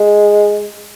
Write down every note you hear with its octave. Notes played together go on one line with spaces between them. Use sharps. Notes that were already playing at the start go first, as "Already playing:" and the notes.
Already playing: G#3